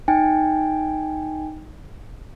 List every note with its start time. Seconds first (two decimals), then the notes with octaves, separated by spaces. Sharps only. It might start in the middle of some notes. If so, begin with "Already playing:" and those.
0.08 D#4 G5 G#5